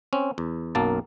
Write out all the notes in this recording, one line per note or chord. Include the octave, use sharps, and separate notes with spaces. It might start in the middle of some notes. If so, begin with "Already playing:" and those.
C4 C#4
E2
B1 F#2 A#3 A5